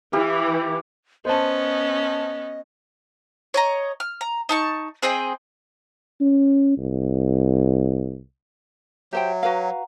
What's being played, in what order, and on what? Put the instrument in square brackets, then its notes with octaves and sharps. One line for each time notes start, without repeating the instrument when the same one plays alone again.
[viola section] E3 [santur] E4 G4 F5
[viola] B3 C#4 [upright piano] C5 A5 [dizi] D#5
[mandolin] C#5 D#5 A#5
F6
A#5
D#4 A5 C#6
C4 G#4 D#5 G5
[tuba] C#4
C2
[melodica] F#3 [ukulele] G4 C5 G5 [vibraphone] E5
[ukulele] F#4 B4 F5 [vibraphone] F#5 A#5